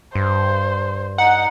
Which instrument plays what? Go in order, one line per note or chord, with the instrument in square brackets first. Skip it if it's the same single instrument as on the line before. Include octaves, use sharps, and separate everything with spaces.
[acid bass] G2 [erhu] C5
[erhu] D#4 [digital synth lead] F#5